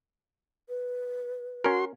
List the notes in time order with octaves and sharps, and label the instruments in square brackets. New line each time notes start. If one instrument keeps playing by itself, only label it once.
[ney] B4
[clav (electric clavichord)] C#4 A#4 [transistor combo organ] F#4 C6